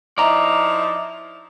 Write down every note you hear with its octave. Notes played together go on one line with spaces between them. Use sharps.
F3 D#4 E4 D5 A#5